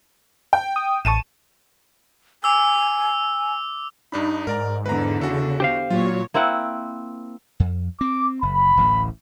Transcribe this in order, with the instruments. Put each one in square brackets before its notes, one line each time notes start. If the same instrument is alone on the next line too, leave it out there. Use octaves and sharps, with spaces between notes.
[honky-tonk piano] G5
[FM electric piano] D#6
[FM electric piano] A1 C#6 [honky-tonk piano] A5 D#7 E7
[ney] G#5 [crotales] D6 E6
[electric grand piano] G2 D4 B5 [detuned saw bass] D#4
[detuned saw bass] G#2 [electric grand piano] A#4 D5 A#5
[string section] E2 D3 [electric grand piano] B4 A#5
[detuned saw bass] C#3 [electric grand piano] F#4 A4
[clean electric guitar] G4 C5 F5
[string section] A#2 C#5 [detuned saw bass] F#3 [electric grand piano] F4
[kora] A#3 C4 E4 F#5
[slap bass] F2
[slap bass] C4 [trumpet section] D6
[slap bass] F#1 [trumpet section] B5
[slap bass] D1 A1 A2